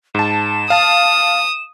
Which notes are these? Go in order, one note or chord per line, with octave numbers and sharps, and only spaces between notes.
G#2 A5 E7
F5 A5 D#6